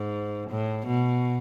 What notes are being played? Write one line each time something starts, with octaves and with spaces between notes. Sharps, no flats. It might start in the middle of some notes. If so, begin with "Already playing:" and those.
Already playing: G#2
A2
B2